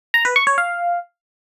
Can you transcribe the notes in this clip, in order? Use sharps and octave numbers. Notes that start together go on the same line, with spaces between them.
A#5
B4
C#6
C#5
F5